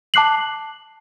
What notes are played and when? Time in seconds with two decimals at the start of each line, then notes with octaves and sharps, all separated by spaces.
0.14 A5 D6 F#6 C7 F#7